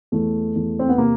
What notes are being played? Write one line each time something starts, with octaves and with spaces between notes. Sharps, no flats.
E2 A3
E2
C4
B3
C3 A#3